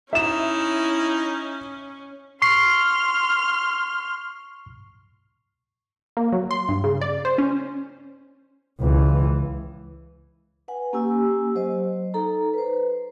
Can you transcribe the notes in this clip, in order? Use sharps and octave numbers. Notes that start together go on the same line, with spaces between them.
C#4 D#4 E4 E5 E7
C6 C#6 F6 C7
A#3
F#3
C6
G2
C#3
D5
C5
C#4
C#2 E3
B4 F#5 G#5
A#3 C#4 G4 G#5 E6
F#3 C5 D#5
D#4 A4 A#5
B4 C5